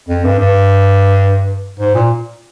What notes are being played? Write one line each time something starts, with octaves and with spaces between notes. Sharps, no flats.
F2
G2
G2
G#2
A#2